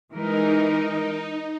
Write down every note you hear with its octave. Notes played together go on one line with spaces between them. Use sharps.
E3 G#3 D#4 A#4